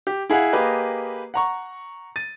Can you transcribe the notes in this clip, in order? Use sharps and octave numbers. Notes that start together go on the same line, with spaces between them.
G4
E4 G#4 F5 F#5
A#3 G4 G#4 B4 D#5
F#5 A#5 C#6
A6 D#7